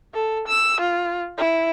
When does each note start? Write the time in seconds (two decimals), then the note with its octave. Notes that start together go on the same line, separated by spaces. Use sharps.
0.15 A4
0.48 E6
0.81 F4
1.38 E4